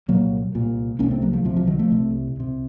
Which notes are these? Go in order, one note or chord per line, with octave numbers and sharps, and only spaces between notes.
C2 A#2 F#3 A#3
C2 A#2
C2 C3 A#3 C#4
A3 C4
F#3 A#3
F3 A3
C2 C3 F3
F3
D#3 F#3
F3 A3
C2 C3
C2 C3